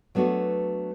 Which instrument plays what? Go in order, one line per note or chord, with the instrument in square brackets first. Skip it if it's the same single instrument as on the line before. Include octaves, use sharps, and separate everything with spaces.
[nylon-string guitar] F#3 A3 B3 D4 F#4